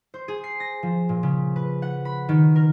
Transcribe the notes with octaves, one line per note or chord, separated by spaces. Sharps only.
C5
G#4
C7
A#6
F3
A#2
C#3
B4
F#5
B5
D#3
A#4